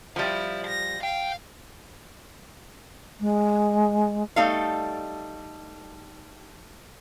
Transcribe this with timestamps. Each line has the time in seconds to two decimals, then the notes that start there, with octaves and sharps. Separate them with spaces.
0.16 F3 G3 E4
0.66 A#6
1.03 F5 G5
3.21 G#3
4.36 G3 A3 D#4 A4 F5